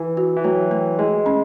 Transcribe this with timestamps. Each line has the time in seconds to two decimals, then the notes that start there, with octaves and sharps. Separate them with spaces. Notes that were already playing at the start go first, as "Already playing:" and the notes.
Already playing: E3
0.17 F#4
0.36 E3
0.44 F#3 A3
0.71 A3
0.99 G#3 A3
1.26 C#4